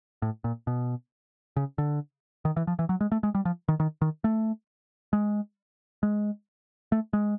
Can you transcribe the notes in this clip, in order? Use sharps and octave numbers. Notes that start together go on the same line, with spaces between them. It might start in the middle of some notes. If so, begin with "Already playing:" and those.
A2
A#2
B2
C#3
D3
D#3
E3
F3
E3
F#3
G#3
A3
G#3
G3
F3
D#3
D#3
D#3
A3
G#3
G#3
A3
G#3